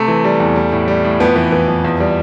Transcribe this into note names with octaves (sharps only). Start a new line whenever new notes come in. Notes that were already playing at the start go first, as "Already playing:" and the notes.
Already playing: C3 A3
E3
G3
E2
G3
A2
G3
A2
F2 B3
E3
E3
F2
E2
G3